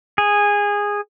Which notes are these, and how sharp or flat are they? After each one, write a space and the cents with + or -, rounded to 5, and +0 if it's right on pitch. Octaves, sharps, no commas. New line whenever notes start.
G#4 -15